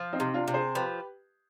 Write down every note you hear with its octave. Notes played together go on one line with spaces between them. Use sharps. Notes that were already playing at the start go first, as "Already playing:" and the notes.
Already playing: F3
C4 D#4
C3
D4 F4
C3
G#4 C5
F3 G4 B4